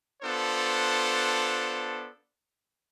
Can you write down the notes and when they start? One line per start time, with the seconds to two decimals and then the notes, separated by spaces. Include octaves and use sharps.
0.22 B3 D4 F4 A4 C5